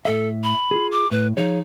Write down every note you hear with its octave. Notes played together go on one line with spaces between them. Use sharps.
A2 A4 E5
B5
F4 G#4
D6
A2 B4
F3 D#4 G#4 C#5